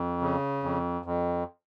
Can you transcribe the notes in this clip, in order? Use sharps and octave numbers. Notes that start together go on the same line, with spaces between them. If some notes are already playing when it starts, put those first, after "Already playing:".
Already playing: F2
C#3
F2
F2